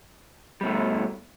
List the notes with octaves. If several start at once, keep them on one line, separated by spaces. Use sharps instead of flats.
B2 G3 A3